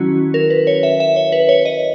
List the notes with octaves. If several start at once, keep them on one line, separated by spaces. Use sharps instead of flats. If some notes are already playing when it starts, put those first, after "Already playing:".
Already playing: D#3 F#3 C#4 E4 F#4
A#4
B4
C#5
E5
E5
C#5
B4
C#5
D#5